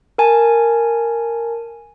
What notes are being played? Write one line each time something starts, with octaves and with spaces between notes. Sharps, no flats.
A#4 G#5 A5